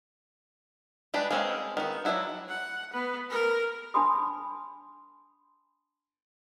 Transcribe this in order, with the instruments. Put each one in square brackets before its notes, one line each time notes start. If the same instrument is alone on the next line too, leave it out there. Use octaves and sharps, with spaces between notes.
[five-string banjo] G3 G#3 D4 B4
G#3 A#3 C4 C#4 F#4
D#3 B3 F#4
F#3 A#3 D4 E4 F#4
[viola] F#5
B3 B4
A#4
[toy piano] D4 G#5 A5 B5 C6 D#6